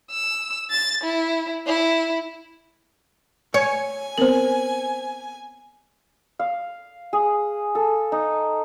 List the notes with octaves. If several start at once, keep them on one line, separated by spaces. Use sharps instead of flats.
E6
A6
E4
E4
C#5 G#5
B3 C4 A#4 C5 F#7
F5
G#4
A4
D#4